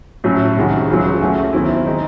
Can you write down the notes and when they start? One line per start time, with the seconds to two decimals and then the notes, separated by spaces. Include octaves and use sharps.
0.24 A2 F#3 C#4
0.57 C3 D#3 G#3 C#4 F#4
0.88 C#2 C#3 F#3
1.21 F#2 E3 A3 C#4 F#4
1.53 E2 D#3 F#3 C4 E4
1.86 D#3 G#3 C4 D#4